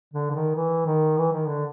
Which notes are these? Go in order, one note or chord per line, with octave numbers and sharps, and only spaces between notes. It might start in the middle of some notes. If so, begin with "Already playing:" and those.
D3
D3
D#3
E3
D#3
E3
D#3
D3